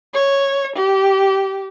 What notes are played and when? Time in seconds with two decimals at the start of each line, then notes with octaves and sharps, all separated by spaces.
0.14 C#5
0.76 G4